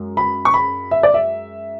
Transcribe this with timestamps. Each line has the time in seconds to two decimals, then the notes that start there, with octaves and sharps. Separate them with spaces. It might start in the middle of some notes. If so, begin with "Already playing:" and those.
Already playing: F#2 G#3
0.17 B5
0.45 C#6
0.54 B5
0.91 E5
1.03 D5
1.14 E5